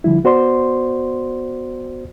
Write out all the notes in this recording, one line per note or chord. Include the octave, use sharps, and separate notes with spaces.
D3 F3 G3 E4
B3 F#4 C5 D5 C6